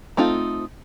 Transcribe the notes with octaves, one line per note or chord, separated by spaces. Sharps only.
A3 C4 D#4 F4